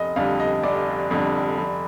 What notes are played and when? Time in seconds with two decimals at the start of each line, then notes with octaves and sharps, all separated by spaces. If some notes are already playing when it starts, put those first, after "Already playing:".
Already playing: F1 D#5
0.16 F2 D3 G3 F5
0.40 D#5
0.63 F1 D5
1.11 F2 D3 G3
1.58 F1